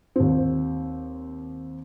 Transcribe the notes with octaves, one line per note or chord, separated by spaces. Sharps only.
D#2 C4